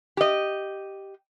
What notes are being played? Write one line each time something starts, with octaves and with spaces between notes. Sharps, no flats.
G4 D#5